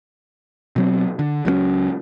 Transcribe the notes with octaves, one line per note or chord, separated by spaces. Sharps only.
B2 F#3 C4
D3
C#2 F#3 G3 C#4